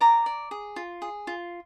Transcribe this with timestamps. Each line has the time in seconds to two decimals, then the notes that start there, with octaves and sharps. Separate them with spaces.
0.01 D5 A#5 D6
0.26 D5
0.51 G#4
0.76 F4
1.02 G#4
1.27 F4